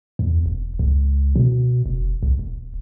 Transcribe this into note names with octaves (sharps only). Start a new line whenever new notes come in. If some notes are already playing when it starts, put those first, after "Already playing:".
E2
E1
C#2
B2
F1
C2
D#1